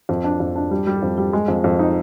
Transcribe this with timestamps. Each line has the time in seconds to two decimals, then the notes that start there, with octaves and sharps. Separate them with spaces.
0.09 F2
0.24 D4
0.40 F2
0.56 D4
0.71 G3
0.87 G3
1.02 F2
1.18 G3
1.33 G#3
1.48 F2
1.64 F2
1.79 D#4